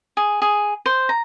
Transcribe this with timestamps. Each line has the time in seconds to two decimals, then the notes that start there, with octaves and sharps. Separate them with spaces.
0.17 G#4
0.42 G#4
0.86 C5
1.09 A#5